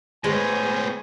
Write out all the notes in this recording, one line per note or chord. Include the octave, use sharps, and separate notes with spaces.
A2 G#3 B3 C5 C#5 G#5